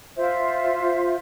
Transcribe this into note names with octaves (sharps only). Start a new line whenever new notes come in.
F4 C5 E5